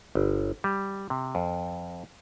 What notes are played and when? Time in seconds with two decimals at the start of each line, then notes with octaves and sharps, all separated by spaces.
0.15 G1
0.64 G3
1.10 C3
1.35 F2